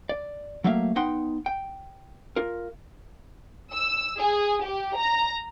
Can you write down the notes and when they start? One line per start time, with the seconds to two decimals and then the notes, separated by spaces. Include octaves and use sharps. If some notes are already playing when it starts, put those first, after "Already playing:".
0.09 D5
0.64 F#3 A3 A#3 E5 F5
0.96 B3 D#4 F#5 G5 C6
1.46 G5
2.36 F4 A#4
3.73 E6
4.19 G#4
4.65 G4
4.96 A#5